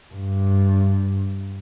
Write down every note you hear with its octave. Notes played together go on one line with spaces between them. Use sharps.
G2